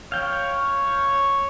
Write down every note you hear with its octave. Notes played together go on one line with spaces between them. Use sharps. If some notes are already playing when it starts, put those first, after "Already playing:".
C#5 F5 G5